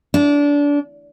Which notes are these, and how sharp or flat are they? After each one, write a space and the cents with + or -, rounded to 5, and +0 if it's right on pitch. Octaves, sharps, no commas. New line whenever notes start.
D4 -25